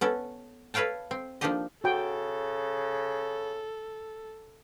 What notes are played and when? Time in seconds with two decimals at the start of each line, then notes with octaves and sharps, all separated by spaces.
0.01 B3 C#4 A4
0.74 A4 B4 C#5 F5 G5 A5
1.11 C4
1.41 F3 A#3 D4 D#4 G4 D#5
1.84 C#3 F#4 A4 G5